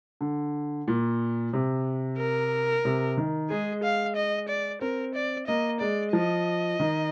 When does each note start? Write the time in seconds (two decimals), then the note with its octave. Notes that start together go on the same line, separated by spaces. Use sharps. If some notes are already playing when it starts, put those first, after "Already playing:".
0.21 D3
0.88 A#2
1.53 C3
2.18 A#4
2.85 C3
3.17 D#3
3.50 G#3 G#4
3.83 F5
4.16 D#5
4.48 D5
4.81 C4 A#4
5.15 D5
5.47 A#3 D#5
5.80 G#3 D5
6.13 F3 D#5
6.80 D#3